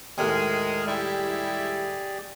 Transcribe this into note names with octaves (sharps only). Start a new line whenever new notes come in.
D#2 A2 G#3 A#4 D#6
G3 G#3 E4 G4 G#4 D5